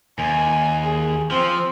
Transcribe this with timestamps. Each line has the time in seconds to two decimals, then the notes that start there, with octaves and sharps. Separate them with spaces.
0.19 D#2 G#5
0.83 G#4
1.31 F3 C4